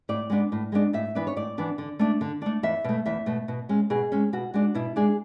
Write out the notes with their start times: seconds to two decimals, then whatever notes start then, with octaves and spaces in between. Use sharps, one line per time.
0.09 A2 D5
0.30 G#3 B3 D4
0.52 A2
0.72 G#3 B3 D4
0.93 A2 E5
1.15 E3 B3 D4 B4
1.27 C#5
1.36 A2 D5
1.58 E3 B3 D4
1.78 D3
1.99 A3 D4
2.21 D3
2.42 A3 D4
2.63 E2 E5
2.84 B2 A3
3.06 E2 E5
3.26 B2 A3
3.48 B2
3.69 G#3 C#4
3.90 B2 G#4
4.12 G#3 C#4
4.33 B2 F#4
4.54 G#3 D4 F#4
4.75 B2 E4
4.96 G#3 D4 G#4